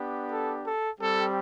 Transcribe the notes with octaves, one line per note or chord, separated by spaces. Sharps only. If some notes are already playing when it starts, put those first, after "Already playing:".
Already playing: B3 D4 G4
A4
A4
G3 C4 G4 A4